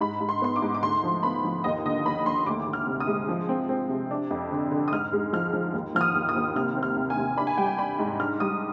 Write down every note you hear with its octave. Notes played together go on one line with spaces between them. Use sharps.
G#2 B5
G#2
C6
B3 C6
D6
G#2
D6
D2 C6
F3
B3 B5
F3
D#2 D#5
D3 D#5
D#2 B5
D#2 C6
D2 D6
D2
F6
C3
D#6
G#3
F3
C4
C4
C3
D4
F2
D3
D3
D#6
G#2 F6
G#3
F3 F6
F3
D#2
F3 F6
D#6
D#2
D#6
D#2
C3 F6
C4
F6
C3
G#5
C3
D4 B5
G#5
G3 G5
G#5
D4 B5
G#2
D4 F6
G3 D#6